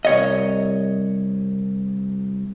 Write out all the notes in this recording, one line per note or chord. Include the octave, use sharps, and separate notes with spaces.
C2 C#5 D#5